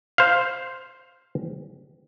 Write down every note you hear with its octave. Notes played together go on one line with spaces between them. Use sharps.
C5 F5